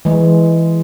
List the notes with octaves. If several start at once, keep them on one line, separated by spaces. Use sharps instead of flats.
E3 G#3